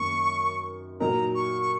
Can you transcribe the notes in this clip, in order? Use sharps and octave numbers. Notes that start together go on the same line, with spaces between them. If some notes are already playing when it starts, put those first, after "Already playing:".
Already playing: F#2 D#3 A#3 C#6
A#2 F#3 D#4 A#4 A#5
C#6
C#6